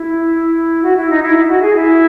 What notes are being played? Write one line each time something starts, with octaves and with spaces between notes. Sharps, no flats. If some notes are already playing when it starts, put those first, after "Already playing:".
Already playing: E4
F#4
E4
D#4
E4
E4
F#4
G#4
E4